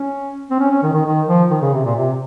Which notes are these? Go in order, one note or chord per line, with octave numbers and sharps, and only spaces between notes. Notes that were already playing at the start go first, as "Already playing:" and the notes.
Already playing: C#4
C4
C#4
C#4
D#3
D#3
D#3
F3
D#3
C#3
C3
A#2
C3